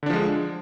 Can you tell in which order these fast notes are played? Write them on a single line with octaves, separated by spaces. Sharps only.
D3 D4 F3 G#3